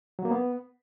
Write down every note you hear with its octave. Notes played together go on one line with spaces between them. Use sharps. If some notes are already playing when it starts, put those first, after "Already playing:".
F#3
A#3
B3